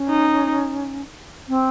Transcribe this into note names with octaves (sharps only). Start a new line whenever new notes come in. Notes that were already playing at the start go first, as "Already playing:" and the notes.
Already playing: C#4
D#4
C4